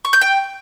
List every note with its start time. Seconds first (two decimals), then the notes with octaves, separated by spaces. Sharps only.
0.05 C#6
0.13 G6
0.21 G5